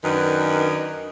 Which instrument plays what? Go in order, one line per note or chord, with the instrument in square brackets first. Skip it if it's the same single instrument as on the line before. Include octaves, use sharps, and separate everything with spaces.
[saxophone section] F#2 D#3 D4 B4